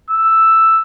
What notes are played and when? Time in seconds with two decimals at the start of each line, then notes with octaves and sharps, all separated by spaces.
0.10 E6